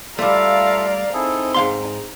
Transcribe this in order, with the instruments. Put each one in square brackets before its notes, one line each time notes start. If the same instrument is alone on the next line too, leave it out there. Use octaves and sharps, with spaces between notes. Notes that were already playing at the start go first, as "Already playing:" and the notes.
[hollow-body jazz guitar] G3 A3 [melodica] F4 A4 E5 [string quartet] D5 F5 A#5
[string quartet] C4 D#4 [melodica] E4 G#4 A4
[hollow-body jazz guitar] G#2 F5 C6 [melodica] A#5